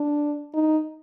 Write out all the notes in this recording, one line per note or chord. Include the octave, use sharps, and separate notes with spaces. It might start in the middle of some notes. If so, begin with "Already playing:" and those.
Already playing: D4
D#4